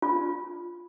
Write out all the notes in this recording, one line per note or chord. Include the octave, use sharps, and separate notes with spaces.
F4